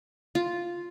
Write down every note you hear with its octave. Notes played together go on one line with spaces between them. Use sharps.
F4